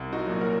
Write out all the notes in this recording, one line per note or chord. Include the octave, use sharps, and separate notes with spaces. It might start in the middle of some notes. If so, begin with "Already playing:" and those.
Already playing: C2
D#4 F#4
A#2 F#3
F#4 A#4